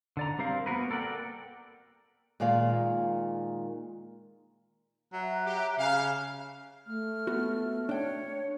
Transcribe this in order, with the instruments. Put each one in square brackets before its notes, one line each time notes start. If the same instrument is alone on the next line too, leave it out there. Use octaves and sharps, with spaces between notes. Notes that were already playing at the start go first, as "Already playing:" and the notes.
[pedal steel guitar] D3 D5 A#5
G3 C4 A#4 C5 F5
A#3 B3 F#4 A#4 B4
A4 A#4 D5 F#5 G5
[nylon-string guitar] A#2 D#3 G#3 D5 F5
[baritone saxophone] F#3 [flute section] E5 A#5 F#6
[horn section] G4
[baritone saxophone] C#3 [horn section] F5
[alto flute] A3 [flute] F6
[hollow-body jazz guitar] B3 F#4
[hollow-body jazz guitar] D4 G5 [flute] C#5